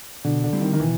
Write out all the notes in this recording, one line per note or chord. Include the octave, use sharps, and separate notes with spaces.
B2 D3
D3
G3 C4 E4 G4
D#3
D#3
B2 E3